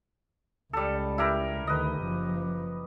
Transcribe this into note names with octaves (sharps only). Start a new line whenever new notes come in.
C#2 G3 A4
E4 G4 A#4
D2 D#3 B4 D#5
F#1 F3